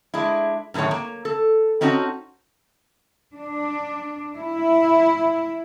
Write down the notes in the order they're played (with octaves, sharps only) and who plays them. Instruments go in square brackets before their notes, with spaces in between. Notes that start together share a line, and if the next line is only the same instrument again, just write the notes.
[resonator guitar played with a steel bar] G#3 D4 E4
F#2 A2 D#3 G#4 C#5
A#3
A4
C4 C#4 D#4 F#4 A5
[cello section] D4
E4